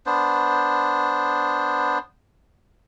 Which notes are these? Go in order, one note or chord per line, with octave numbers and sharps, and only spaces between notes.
B3 D4 C5